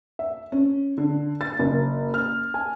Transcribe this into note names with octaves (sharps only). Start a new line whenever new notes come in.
E5
C#4
D3
A6
F#1
F6
G#5